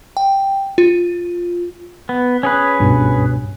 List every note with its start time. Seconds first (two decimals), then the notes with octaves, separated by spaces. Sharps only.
0.17 G5
0.78 F4
2.09 B3
2.43 C#4 G#4 B4
2.79 C#2 G2 B2